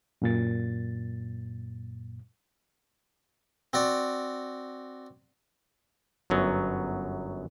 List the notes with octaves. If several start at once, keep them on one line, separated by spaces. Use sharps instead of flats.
F#2 A#2 A6
C4 F#4 D5
G1 F#2 F#3 B3